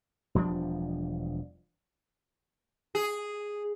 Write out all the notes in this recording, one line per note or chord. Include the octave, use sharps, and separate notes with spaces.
E1 F3 G3 D4
G#4